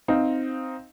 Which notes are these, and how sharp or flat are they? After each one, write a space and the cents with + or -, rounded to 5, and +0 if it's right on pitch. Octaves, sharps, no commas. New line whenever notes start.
C4 +0 D#4 +5 F5 +0